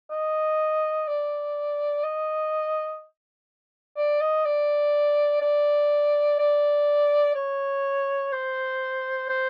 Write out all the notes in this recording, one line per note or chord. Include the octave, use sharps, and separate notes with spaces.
D#5
D5
D#5
D5
D#5
D5
D5
D5
C#5
C5
C5